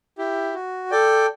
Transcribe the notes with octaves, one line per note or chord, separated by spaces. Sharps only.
E4 G4
F#4
A4 D5 G5